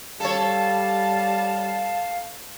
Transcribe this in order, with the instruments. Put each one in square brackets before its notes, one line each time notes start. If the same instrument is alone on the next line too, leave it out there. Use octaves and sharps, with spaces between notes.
[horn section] G3 [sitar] A4 C#5 [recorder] F5 [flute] A5